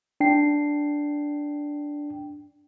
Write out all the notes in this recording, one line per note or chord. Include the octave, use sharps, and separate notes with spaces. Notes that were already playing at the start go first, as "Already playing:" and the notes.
D4 G5 C7